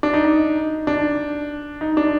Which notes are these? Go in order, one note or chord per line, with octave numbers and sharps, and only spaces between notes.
D4
D#4
D#4
D4
D#4
D4